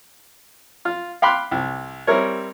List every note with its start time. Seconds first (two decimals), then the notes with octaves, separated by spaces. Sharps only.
0.85 F4
1.22 F5 G5 B5 C6 D6 F#6
1.51 C2
2.07 G3 C4 E4 A#4 C#5